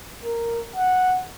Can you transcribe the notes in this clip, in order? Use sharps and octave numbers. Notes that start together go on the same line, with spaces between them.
A#4
F#5